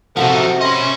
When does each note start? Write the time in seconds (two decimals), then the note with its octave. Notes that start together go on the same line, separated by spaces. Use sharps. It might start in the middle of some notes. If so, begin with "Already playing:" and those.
0.17 C3 F3 D#4 F#4 A4 E5 F#5
0.61 C#4 D#5 B5 C6